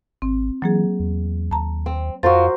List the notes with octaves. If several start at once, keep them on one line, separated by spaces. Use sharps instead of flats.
G#1 C4
E3 F#3 A#3 G#4
E2
D#2 A5 A#5
C4
F2 F3 F4 F#4 A#4 C5 A6